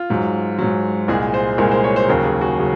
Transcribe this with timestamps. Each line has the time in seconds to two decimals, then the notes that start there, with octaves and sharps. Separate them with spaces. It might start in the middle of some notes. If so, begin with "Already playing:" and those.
Already playing: F4
0.10 G#2 F#3
0.58 G#2 F#3
1.08 C2 A#2 G#3 G#4
1.34 C5
1.58 C2 A#2 G#3 A#4
1.71 C5
1.84 C#5
1.96 C5
2.08 D#2 C#3 F#3 A#4
2.24 G#4
2.41 F#4
2.60 C#3 F#3